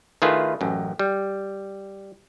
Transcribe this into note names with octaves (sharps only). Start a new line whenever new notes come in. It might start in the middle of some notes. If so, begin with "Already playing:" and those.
D#3 A3 E4 F4 G#4 B4
A1 F#2
G3